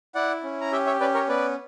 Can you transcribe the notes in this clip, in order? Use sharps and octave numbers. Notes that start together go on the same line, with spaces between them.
E4 D5 F#5
C#4
A#5
G4 E5 G5
C#5 E5
C#4 B4 D5
A#4 C#5
B3 B4 D5